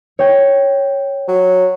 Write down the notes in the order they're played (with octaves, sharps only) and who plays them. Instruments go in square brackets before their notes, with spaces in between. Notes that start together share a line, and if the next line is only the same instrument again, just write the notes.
[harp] C#5 G5
[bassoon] F#3